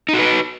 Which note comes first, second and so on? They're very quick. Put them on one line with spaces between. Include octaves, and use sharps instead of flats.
D#4 F#4 B4